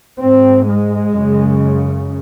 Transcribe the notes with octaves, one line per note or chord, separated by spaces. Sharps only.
G#2 C4
G#3
F#2 C#3